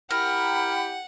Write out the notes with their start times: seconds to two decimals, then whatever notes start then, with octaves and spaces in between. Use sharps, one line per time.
0.11 E4 G4 A#4 F#5 G5 B5